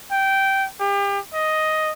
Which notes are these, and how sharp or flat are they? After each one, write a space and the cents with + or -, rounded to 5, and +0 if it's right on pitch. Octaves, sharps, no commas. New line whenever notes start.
G5 -10
G4 +35
D#5 +5